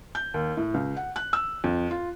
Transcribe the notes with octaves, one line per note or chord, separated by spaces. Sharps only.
G6
D#2
A2
C#2
F#5
F#6
E6
F2
F4